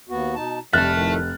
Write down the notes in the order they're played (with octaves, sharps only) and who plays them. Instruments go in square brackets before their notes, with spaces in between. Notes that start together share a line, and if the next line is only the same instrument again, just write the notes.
[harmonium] D#2 B3 F#4
B2 D#4 A5
[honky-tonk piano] F1 F6 [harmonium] G3 [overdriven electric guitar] E5 A5 [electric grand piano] F#6 A6
[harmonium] F2 A2 D#3